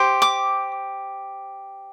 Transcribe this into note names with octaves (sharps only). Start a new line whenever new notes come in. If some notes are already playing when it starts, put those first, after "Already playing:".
Already playing: G4 C5
D6